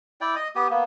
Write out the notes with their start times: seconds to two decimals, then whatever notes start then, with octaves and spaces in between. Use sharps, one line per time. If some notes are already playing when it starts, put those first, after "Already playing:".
0.21 E4 D5 G5
0.36 D#5 D#6
0.55 B3 G4 D#6
0.71 A#3 B3